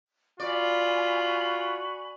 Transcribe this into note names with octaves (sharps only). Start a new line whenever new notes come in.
F4 F#4 D5 G#5 B5